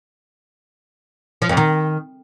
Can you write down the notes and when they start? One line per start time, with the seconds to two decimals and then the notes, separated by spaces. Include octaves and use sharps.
1.42 F3
1.49 F2
1.57 D#3